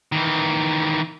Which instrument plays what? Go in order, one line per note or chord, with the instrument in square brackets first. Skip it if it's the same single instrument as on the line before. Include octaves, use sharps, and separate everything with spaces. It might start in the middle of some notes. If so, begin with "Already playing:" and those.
[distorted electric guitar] D#3 E3